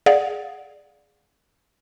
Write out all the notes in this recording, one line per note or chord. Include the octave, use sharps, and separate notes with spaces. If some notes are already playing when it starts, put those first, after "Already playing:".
G#4 D5 F5 F#5